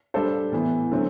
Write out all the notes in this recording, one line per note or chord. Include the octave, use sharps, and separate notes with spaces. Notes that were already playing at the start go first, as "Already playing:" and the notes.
G3 D4 A4 C5
A2 E3 B3
D3 F#3 A3 C4